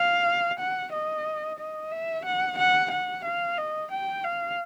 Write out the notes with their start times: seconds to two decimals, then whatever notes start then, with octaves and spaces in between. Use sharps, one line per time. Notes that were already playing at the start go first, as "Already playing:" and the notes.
Already playing: F5
0.59 F#5
0.92 D#5
1.59 D#5
1.91 E5
2.25 F#5
2.58 F#5
2.91 F#5
3.24 F5
3.57 D#5
3.91 G5
4.24 F5